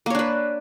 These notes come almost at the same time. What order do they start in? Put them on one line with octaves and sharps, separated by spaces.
A#3 C#5 D4 B4